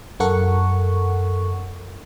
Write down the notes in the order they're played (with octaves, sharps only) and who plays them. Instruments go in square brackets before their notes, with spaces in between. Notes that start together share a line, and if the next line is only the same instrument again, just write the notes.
[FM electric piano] F#2 A4 A#4 F#5 C#6